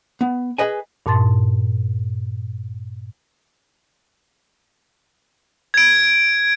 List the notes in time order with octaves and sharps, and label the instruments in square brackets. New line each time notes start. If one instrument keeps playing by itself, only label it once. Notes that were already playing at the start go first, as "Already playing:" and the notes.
[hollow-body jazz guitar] B3
G#4 B4 D#5 G#5
[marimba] G2 A#2 A5 C6 A6
[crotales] G#6 D7